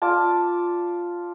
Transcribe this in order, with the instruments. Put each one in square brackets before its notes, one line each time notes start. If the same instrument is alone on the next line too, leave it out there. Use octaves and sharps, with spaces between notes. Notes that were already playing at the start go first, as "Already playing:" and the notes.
[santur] F4 D5 A5